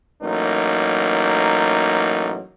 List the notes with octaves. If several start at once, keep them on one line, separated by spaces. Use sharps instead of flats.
A1 F#3 A#3 D#4